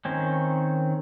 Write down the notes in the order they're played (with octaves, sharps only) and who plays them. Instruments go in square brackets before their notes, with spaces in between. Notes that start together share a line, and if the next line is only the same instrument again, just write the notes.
[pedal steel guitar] D#3 C4 C#4